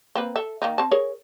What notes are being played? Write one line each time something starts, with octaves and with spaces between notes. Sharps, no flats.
A#3 C4 B4
A4 E5
D#3 A#3 D#4
C4 A5
G#4 A#4 C#5